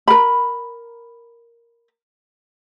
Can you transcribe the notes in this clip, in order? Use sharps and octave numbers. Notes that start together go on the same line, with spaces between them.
A#4 B5